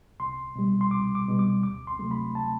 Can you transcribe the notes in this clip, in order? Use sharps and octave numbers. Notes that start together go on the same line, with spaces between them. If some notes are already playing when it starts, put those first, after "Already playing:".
C2 C6
B2 G3
C6
C2 D6
D6
B2 G3
D6
D2 D6
C6
C3 F#3 A3
B5
A5